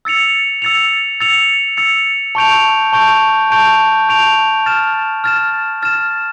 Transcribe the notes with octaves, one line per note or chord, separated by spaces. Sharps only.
E6 A6 C#7 F7
E6 A6 C#7 F7
E6 A6 C#7 F7
E6 A6 C#7 F7
A5 C#6 G6 D7 F7
A5 C#6 G6 D7 F7
A5 C#6 G6 D7 F7
A5 C#6 G6 D7 F7
F6 A6 E7
F6 A6 E7
F6 A6 E7